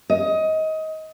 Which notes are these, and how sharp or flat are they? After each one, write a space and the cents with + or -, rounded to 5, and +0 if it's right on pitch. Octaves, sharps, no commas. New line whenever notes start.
D#5 +20